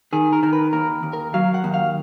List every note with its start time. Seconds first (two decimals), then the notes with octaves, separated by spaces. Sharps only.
0.13 D#3 G#4
0.33 A#4
0.43 D#3 A#4
0.53 B4
0.73 D#2 A#4
1.03 D#2
1.13 A#4
1.34 F#3 F5
1.54 F#5
1.64 D#2
1.74 F5